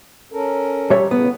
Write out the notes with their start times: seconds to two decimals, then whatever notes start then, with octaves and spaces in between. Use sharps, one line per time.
0.32 C#4 A4 A#4
0.90 G3 C#5 E5
1.11 A2 C#3 B3